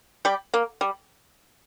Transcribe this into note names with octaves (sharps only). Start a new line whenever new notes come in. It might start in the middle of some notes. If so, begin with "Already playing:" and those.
G3 G4
A#3
G3